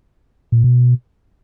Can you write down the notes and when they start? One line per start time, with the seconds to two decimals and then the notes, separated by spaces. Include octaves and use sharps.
0.52 A#2
0.64 B2